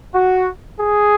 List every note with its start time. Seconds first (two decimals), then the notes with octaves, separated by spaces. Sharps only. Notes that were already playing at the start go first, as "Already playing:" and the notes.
0.14 F#4
0.79 G#4